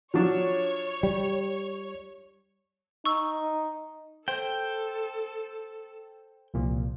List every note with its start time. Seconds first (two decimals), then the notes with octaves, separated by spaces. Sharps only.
0.14 F3 F#3 D4 C#5
1.03 G3
3.05 D#4 C#6 E6
4.28 A4 C5 G5
6.54 C2 A#2 F3